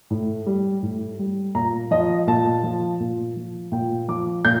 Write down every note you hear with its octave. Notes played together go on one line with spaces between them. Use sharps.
A2
G3
A2
G3
A#2 A#5
F3 D#5
A#2 A5
F3
A#2
F3
A#2 G5
F3 D6
A#2 G6